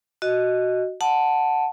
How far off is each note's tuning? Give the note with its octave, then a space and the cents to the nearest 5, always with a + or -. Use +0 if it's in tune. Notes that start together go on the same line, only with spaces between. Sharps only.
F#4 +5 D#5 +0
F#5 +0 A5 +0